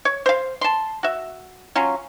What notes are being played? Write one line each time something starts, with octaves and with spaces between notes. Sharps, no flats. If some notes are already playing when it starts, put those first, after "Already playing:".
C#5
C5 F5
A5 C6
F#4 E5
F#3 C#4 F4